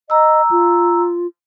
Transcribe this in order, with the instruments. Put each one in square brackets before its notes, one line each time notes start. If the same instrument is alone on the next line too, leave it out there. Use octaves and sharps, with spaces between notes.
[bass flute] D#5 [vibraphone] A#5 E6
[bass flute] F4